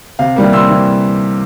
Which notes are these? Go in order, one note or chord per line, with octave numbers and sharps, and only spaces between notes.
C3 F5
E3 G3 A#3
C3 C6 E6
E3